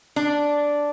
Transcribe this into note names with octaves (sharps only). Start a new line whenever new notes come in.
D4